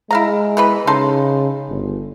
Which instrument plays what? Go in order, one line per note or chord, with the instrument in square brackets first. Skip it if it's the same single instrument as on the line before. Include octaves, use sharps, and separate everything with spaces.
[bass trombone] G#3 [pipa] E4 F5 A#5
[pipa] E3 B3 B4
[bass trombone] C#3 [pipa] D#4 A4 C6
[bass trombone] G1